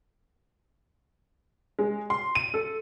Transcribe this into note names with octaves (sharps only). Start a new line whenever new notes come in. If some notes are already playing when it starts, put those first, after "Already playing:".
G#3
C6
D#7
A4